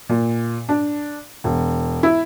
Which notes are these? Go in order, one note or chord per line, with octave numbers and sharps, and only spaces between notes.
A#2
D4
E1
E4